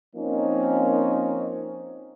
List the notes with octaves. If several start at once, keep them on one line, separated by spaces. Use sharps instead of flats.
F3 A#3 C4 C#4 D#4